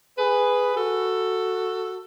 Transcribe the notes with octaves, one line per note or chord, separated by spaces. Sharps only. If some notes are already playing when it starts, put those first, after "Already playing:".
G#4 B4
F#4 A4